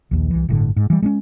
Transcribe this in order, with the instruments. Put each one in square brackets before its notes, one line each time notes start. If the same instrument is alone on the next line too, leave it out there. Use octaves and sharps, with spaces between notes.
[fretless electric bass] A#1 D#2
C2 E3
G1 A2 D3
G#2
E3 G3
G#3 A#3 C#4